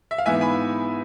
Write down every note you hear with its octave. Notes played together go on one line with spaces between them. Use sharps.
E5
F5
G#2 E3 B3 E5 G#5
G#5 B5